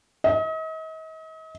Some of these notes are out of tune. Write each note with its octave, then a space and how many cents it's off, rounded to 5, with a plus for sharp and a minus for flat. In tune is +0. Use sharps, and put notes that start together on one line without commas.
D#5 +40